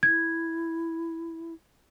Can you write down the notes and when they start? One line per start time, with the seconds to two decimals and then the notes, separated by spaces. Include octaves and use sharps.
0.03 E4 G#6